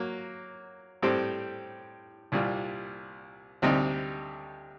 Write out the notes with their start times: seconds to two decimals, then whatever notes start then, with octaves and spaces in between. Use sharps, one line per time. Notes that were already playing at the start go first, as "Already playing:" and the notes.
Already playing: F#3 A#3
1.02 A2 G3 C4 G4 C5
2.32 C2 A#2 G3
3.62 D2 C3 G3 C4 D#4